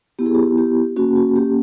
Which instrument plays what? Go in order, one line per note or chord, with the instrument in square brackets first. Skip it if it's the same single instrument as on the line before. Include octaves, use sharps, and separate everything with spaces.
[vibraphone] B3 E4 G4
G#4
G4
G4
A#3 C#4 F#4
F#4
G4